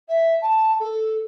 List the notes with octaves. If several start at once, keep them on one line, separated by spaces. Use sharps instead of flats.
E5
A5
A4